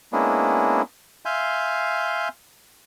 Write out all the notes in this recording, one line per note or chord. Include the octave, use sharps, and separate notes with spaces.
G#3 A#3 B3 C#4 D4 E4
E5 F5 G#5 C6 G6